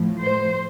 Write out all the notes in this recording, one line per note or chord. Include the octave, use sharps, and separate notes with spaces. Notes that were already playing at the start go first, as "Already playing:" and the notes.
Already playing: A2 F3
C5